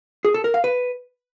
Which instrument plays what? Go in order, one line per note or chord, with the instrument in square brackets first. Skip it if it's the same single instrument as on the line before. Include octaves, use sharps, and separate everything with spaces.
[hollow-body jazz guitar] G#4
A4
A#4
F5
B4